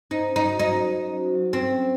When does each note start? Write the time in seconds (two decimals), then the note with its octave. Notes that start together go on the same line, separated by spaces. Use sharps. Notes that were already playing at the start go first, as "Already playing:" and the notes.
0.11 D#4 C5
0.30 C#4
0.36 D#4
0.46 F#4
0.59 F#3 D#4
0.82 C5
1.01 C#4
1.18 F#4
1.35 F#3
1.53 C4 C5
1.71 C#4